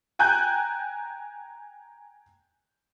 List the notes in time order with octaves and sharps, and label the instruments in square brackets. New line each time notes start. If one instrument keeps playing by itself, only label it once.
[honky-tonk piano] G5 G#5 A#5 F#6 G6